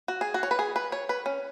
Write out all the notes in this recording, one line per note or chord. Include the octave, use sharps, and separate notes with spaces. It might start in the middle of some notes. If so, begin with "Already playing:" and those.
F#4
G#4
F#4
C#5
B4
G#4
B4
C#5
B4
C#4